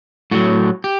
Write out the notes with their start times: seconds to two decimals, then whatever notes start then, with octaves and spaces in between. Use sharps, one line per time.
0.31 A2 F#3 F#4
0.84 G4